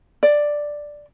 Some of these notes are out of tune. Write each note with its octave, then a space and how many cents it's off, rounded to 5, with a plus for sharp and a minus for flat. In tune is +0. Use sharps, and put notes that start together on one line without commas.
D5 +5